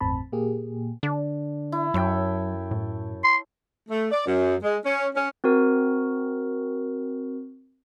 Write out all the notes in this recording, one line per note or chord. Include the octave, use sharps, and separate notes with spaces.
G1 E2 A2 C4 A5 B5
A#2 A#3 G4 G#4
D3 D4
E4
F#2 F#3 A4 C#5 G5
A2
C6
A3
D5
F#2
G#3
C#4
C#4
C4 F#4 A#4